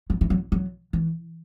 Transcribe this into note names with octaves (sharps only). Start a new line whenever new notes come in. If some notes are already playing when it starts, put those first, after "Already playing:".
F#3
E3
F#3
F#3
E3